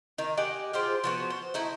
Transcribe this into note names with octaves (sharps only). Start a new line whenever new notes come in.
D#3 D#4
G4 D#5 F#5 G#5
F4 G4 G#4 C5
F3 B3 F#4
C5
A3 D#4 E4